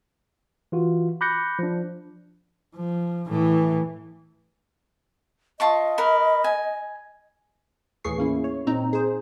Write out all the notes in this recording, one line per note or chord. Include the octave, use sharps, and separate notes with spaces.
E3 F4 F#4
B5 D6 F#6 G6 A#6 C#7
F3 D4
F3
A2 E3
F4 D#5 A5 C#6
A#4 B4
G#5
D#2 A2 E3 G#4 C#6 C7
A#3 C#4 E4
C#5
A#2 C4 D#4 A#5
G#4 C5